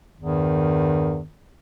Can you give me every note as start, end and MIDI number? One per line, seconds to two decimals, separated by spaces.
0.20 1.23 40
0.20 1.23 43
0.20 1.23 51